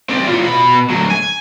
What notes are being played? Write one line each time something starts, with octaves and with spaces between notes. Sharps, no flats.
C4 D5
A2 F4
B2 B5
D2 F#3
G#5